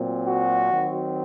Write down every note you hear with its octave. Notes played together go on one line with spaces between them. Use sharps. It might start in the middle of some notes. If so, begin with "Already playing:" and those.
Already playing: A#2 F#3 C4
F#4
D#3 F#3 C4